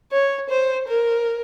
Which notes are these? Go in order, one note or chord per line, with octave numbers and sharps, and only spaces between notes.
C#5
C5
A#4